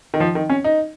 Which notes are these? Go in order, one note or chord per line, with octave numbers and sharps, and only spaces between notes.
D#3
F3
D#3
C#4
D#4